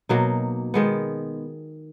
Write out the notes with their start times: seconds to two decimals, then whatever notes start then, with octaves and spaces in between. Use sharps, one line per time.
0.09 B2 F#3 A#3 D#4
0.74 D#3 G#3 B3